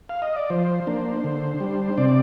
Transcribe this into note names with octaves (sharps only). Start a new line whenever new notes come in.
F5
D#5
D5
F3 C5
A#3 D4
D3
G3 D4
C3 D5